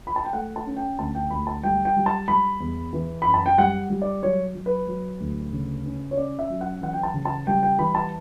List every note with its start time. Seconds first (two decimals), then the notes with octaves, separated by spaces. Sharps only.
0.07 B5
0.16 A5
0.25 G5
0.33 A3 F#5
0.56 A5
0.66 C#4
0.76 G5
0.99 D2 A5
1.15 G5
1.30 D2 B5
1.47 A5
1.63 G3 G5
1.85 G5
1.96 G3
2.06 A5
2.28 G3 B5
2.60 E2
2.93 E3
3.22 F#2 B5
3.34 A5
3.46 G5
3.58 G3 F#5
3.90 G3
4.02 D5
4.22 F#3 C#5
4.54 F#3
4.66 B4
4.87 F#3
5.20 D2
5.53 C#3
5.85 C#4
6.11 C#5
6.17 C#4 D5
6.39 E5
6.50 F#3
6.61 F#5
6.81 E3 F#5
6.93 G5
7.03 A5
7.14 C#3
7.25 A5
7.47 G3 G5
7.63 G5
7.79 E3 B5
7.95 A5